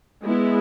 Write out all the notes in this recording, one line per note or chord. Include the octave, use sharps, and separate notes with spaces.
G#3 B3 E4